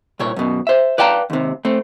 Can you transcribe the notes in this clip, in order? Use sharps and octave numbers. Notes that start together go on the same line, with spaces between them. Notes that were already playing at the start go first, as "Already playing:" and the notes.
C2 A#2 C#5
F#2 B2
C5 E5
B4 D5 F5 G5 A5 A#5
D#2 C3
A3 C4